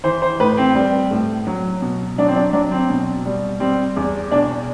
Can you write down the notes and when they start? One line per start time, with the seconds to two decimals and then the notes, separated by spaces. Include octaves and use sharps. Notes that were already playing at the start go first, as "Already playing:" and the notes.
0.04 E3 C5
0.22 C5
0.40 A2 B4
0.57 C4
0.75 G3
1.11 A2
1.47 F#3
1.82 B2
2.18 F#3 D4
2.28 C4
2.36 D4
2.53 F#3 D4
2.72 C4
2.89 B2
3.25 G3
3.60 G3 C4
3.96 E2
4.31 B2 D4